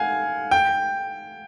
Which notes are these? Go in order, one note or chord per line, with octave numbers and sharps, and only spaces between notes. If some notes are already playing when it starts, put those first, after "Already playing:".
Already playing: F5 F#5 G#5
G5